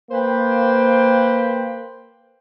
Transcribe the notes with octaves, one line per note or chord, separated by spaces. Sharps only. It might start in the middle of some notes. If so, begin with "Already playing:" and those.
A#3 B4 C5 G5